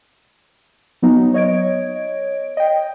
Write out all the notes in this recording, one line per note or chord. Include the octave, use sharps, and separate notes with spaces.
F#3 B3 D#4
C#5 D#5 G#6 D7
D#5 G5